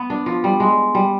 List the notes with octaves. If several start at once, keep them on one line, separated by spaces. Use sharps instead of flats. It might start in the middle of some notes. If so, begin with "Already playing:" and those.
Already playing: B3
D4
F3
G3
G#3
G3